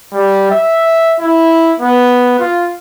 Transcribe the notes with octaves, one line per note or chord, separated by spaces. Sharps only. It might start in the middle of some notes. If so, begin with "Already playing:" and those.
G3
E5
E4
B3
F4